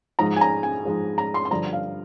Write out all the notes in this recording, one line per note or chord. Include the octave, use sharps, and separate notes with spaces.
G#2 F3 G#3 D#4 A#5
G#5
A#5
G#5
G#2 F3 G#3 D#4
A#5
C6
C6
G2 D3 F3 A#5
F5